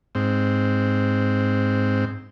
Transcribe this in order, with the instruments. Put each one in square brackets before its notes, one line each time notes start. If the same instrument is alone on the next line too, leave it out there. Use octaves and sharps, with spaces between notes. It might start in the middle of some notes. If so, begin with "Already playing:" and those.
[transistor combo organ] G#2 C4